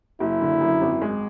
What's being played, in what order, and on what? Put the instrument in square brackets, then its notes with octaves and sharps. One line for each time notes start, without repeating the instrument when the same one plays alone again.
[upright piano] F#1 [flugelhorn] E4
[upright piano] D3
F#2
G#1
G#3